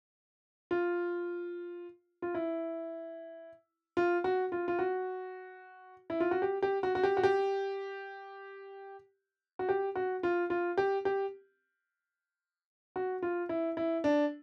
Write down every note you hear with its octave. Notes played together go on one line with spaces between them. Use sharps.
F4
F4
E4
F4
F#4
F4
F4
F#4
E4
F4
F#4
G4
G4
F#4
F#4
G4
F#4
G4
F#4
G4
F#4
F4
F4
G4
G4
F#4
F4
E4
E4
D4